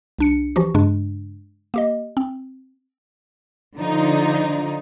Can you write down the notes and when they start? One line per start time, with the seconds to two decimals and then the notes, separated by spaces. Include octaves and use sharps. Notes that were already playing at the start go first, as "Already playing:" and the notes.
0.19 C2 D4 C#7
0.56 E3 F3 F#4 G4
0.74 G2 C#3 G#3 D4
1.74 A#3 G4 D#5
2.17 C4
3.77 D3 F3 D#4